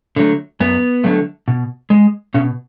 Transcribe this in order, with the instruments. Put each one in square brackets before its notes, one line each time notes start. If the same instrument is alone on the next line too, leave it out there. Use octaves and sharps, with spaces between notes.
[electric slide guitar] D3 F#3 A3
F#2 B3
D3 F#3 A3
B2
G#3
B2 C#4